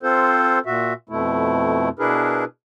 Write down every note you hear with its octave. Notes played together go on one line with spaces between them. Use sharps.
C4 F4 A4 C5
A#2 F#4 E5
F2 B2 A3 E4
B2 D4 E4 G#4 A#4 B4